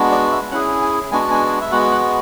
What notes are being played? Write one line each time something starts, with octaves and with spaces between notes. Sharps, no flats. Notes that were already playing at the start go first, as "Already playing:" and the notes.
Already playing: G#3 B3 D4 F#4
D5
E5
C#4 E4 G#4 F#5
G#5
G#3 B3 D4 F#4 G#5
A5
G#5
E5
G#3 B3 F#4 F#5
F#5